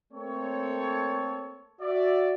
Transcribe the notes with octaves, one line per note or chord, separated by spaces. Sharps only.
A3 A#3 C4 A4 C#5
F#4 D5 E5